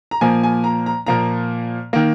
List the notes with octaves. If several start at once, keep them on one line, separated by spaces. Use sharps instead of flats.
A#5
A#2 F3 A#3 G#5
G#5
A#5
A#5
A#2 F3 A#3 A#5
D#3 A#3